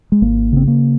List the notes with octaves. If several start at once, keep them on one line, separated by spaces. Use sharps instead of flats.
G#3
G#1 A#3
C#3 C4
A#3